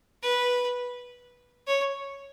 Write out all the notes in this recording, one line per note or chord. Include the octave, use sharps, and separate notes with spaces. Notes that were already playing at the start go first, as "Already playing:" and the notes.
B4
C#5